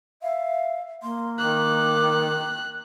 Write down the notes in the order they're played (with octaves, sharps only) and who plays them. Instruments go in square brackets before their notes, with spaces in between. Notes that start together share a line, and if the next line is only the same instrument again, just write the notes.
[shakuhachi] E5 [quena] F5
[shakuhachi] A#3 [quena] C6
[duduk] D#3 [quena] D6 [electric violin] F#6